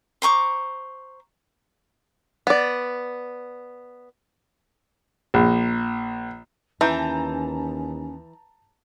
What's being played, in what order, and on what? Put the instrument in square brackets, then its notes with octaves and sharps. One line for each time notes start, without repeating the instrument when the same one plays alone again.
[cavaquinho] C5 A#5 C#6 D6
[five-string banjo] B3 D5
[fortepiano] A#1
[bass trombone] D#2 [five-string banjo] E3 [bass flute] C#4 [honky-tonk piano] A5 A#5 G6